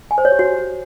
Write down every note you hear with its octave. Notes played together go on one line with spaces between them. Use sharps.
G#5
C5
C#5
G4
F#4